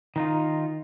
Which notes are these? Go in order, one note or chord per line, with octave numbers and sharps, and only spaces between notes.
D#3 D#4 F4